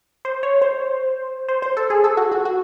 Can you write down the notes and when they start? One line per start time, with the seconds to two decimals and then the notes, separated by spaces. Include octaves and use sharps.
0.25 C5
0.43 C#5
0.62 C5
1.48 C5
1.62 C5
1.77 A4
1.90 G#4
2.04 A4
2.17 F#4
2.32 F#4
2.45 F#4